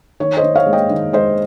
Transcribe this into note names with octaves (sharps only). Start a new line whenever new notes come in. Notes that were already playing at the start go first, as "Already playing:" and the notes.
D#3 C#5
C5 D#5
D#3
C#5 F5
G#3
D#5 G5
D#3
G#3 C5 D#5